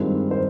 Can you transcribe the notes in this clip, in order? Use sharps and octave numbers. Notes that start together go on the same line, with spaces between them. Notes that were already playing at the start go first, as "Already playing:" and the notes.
Already playing: G2 D#3 G#3 C4 F4
C5